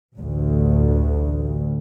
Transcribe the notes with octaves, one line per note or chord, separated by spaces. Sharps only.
A1 D2